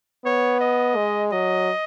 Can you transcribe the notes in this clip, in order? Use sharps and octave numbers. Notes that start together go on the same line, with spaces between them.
B3 C#5
D#5
G#3
F#3 D#5